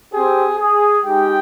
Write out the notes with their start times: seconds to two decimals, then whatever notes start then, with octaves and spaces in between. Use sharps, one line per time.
0.12 C4 G4 G#4
0.57 G#4
1.04 G#3 D#4 G4 G5